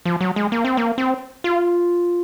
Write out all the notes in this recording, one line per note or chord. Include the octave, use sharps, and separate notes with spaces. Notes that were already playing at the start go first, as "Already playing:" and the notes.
F3
F#3
G#3
A#3
C4
A#3
C4
F4